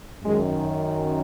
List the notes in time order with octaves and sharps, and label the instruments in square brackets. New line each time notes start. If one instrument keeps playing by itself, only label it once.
[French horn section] F#2 D#3 G#3